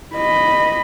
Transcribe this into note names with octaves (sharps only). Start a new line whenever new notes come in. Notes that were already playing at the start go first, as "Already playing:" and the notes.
D#5 B5